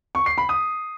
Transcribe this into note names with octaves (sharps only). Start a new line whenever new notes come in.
C#6
C7
B5
D#6